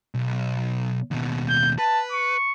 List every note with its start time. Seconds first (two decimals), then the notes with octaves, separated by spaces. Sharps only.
0.14 B1
1.11 D#2 B2
1.49 G6
1.78 B4 A5
2.12 C#6